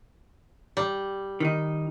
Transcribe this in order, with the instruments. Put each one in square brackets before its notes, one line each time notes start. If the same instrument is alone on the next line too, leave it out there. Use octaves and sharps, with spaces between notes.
[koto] G3
[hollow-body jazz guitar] D#3 D#4